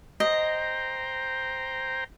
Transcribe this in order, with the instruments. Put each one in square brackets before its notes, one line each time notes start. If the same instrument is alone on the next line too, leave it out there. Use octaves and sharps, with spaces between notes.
[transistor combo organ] C5 G5 A#5 [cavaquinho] D#5